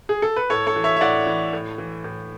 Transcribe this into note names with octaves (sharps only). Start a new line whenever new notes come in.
G#4
A4
B4
A2 A4 C#5
A4 C#5
E3
C#5 E5
E5
A2 D5 F#5
E3
A2
E3
A2